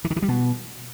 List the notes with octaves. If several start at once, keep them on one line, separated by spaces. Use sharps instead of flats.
E3
D#3
E3
G3
B2